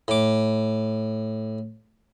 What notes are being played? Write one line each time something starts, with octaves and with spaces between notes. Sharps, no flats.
A2 D6